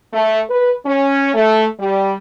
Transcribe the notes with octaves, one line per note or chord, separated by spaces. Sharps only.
A3
B4
C#4
A3
G3